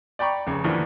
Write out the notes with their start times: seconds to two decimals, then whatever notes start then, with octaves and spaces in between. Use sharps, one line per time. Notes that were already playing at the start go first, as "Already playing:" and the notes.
0.19 D5 G5 A#5 B5 C#6
0.47 F1 C#3
0.64 D#2 A2 D3 E3 F3